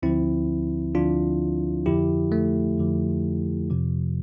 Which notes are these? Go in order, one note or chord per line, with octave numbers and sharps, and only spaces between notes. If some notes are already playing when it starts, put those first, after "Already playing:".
D2 D3 F3 C4 E4
D2 D3 F3 D4 F4
F2 D3 F3 E4 G4
A3
F2 D3 F3
F2 C3 F3